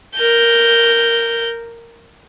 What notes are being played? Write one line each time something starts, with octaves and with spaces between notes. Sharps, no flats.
A#4 G6